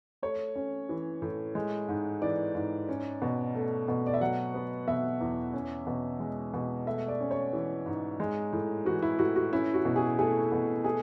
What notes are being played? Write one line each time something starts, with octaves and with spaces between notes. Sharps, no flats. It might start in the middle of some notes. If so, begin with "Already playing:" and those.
A3 C#5
C#4
E3
A2
G#3
G#2
E3 D5
G#2
C#4
B2
A3
B2
D5
E5
F#3 F#5
B3
B2 E5
E2
C#4
B2
G#3
B2
A3 E5
D5
C#4
C#5
E3
G#2
G#3
A2
E3 F#4
E4
A2 F#4
F#4
C#4 E4
F#4
B2
G#4
A3 G#4
B2
A3 G#4